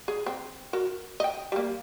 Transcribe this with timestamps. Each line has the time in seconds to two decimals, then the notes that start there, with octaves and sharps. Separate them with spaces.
0.08 G#4
0.26 C4
0.73 F#4 A#4
1.20 D#5 G5
1.52 G3 A#3